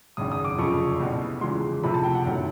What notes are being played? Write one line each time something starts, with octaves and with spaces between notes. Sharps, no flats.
G#1 F#2 C#3 D#6
D#6
D6
F1 F2 C#3 F3 C#6
C2 B2 G3
E2 C#3 F3 G#3 C6
F2 C3 F3 A3 B5
A5
G5
F#5
F#1 F#2 D#3 F#3 A3